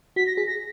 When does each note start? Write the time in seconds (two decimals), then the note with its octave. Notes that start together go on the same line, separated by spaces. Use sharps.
0.16 F#4 B6
0.27 A#6
0.37 G#4 B6
0.47 A#6